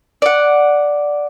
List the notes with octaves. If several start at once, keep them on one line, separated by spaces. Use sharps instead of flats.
D5 F#5